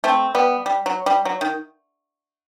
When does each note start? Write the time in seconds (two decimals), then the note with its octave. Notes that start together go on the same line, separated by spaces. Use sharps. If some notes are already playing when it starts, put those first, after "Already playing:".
0.04 A3 C4
0.35 G3 B3
0.66 G3
0.86 F#3
1.06 G3
1.25 F#3
1.41 D#3